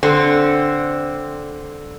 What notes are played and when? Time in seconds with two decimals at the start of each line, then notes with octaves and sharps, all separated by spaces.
0.03 D3 C4